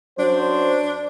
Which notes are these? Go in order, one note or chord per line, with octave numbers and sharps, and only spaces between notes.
F#2 F#3 D4 C5